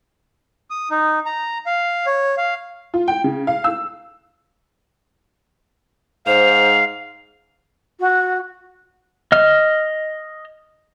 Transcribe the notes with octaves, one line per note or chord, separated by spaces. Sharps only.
D#6
D#4
A#5
F5
C#5
F5
F4
G5
C#3
F5
E6
G#2 C5 F5 F7
F#4
D#5 F6